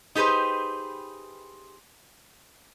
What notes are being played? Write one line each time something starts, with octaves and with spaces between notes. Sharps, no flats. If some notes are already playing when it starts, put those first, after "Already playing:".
D#4 G4 G#4 B4 C5